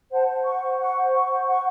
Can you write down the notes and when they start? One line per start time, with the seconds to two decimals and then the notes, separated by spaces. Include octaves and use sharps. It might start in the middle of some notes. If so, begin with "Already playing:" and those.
0.10 C5 F#5 A5
0.28 C5
0.44 F#5 C#6
0.62 C5
0.78 F#5 C#6
0.96 C5
1.13 F#5 C#6
1.29 C5
1.47 F#5 C#6